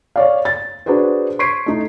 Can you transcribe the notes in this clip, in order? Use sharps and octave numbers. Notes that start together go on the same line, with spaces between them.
C#5 D5 F5
A6
D4 F#4 G#4 B4 C5
C6 C#6 G#6 B6 C7 D7
A3 D#4